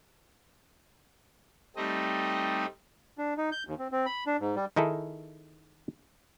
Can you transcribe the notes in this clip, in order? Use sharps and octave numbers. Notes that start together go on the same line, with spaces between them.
G3 A3 C4 D#4 D#5
D4
D#4
G6
D#2
C4
C4
B5
D4
G#2
G3
D#3 D#4 E4 G#4 A4